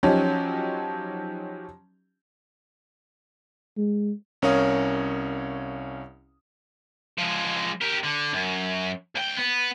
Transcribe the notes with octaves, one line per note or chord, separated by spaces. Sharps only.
F3 F#3 C#4 D#4 G4
G#3
C2 C#4 A#4 C#5 F5 D#6
F3 G#3
G4 A#4
D3
F#2
C#2 G5
B3